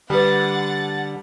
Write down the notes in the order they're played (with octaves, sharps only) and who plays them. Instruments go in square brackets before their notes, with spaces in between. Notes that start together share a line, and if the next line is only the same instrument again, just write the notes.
[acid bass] D3 [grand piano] G3 [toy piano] A4 B4 [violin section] F#5 A6